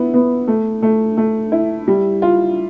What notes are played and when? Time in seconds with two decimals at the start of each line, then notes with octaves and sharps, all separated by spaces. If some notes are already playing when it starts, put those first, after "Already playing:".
Already playing: B3 E4
0.14 B3
0.48 A3
0.82 A3
1.17 A3
1.52 E4
1.88 G3
2.22 F4